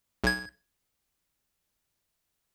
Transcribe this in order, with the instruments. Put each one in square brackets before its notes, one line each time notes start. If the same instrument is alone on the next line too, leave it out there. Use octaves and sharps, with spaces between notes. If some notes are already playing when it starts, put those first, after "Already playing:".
[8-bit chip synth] B1 G#6